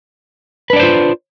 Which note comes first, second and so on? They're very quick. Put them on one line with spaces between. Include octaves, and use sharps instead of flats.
B4 D4 D5 C5 F4